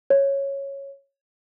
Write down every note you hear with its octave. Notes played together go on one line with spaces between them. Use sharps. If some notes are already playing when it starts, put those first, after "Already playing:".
C#5